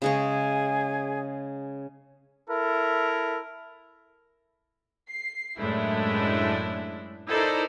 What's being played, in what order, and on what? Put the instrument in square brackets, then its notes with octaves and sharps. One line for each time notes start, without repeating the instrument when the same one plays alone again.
[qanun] C#3 G#3 C#5 [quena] G#4
[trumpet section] E4 A4 A#4
[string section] C7
F#2 A2 G#3 A3 D4 E4
D#4 E4 A4 A#4 C5 D5